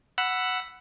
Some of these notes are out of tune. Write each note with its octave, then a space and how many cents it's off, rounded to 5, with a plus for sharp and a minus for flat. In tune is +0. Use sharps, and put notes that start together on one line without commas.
F#5 +0 B5 +0 E6 +10